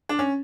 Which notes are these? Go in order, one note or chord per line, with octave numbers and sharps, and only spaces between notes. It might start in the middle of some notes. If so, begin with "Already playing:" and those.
D4
C#4